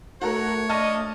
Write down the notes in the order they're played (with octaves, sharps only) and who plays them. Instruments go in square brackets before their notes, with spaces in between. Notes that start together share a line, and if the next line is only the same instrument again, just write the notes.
[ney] A3 [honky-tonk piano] F#4 A4 A#4 [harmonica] C#5
[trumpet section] D4 D#5 [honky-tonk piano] A5 C#6 F6